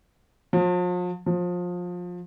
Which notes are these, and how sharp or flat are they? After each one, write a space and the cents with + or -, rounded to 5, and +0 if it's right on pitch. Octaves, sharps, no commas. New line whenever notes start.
F3 +40
F3 +25